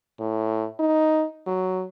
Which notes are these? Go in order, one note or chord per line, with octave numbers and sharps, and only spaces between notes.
A2
D#4
F#3